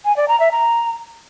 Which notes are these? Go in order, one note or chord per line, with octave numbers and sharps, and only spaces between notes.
G#5
D5
A#5
E5
A#5